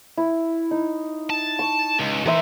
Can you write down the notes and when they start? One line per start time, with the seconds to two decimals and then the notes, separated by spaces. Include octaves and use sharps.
0.17 E4
0.71 D#4
1.30 A5
1.59 C#6
1.99 C#2
2.26 E3 A#4 C5 E5